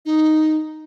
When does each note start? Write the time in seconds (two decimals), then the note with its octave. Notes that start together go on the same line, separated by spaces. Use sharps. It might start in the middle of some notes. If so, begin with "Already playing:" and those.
0.05 D#4